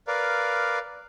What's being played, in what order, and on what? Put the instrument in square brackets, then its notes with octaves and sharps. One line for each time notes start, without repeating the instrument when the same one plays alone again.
[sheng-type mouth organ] A#4 B4 D5 F5